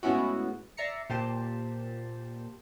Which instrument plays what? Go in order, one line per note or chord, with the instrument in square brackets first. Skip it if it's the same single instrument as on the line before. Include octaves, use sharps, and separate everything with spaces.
[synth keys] A2 G#3 B3 C#4 E4 F#4
D5 E5 A#5 C7 C#7
A#2 G4 C5 A5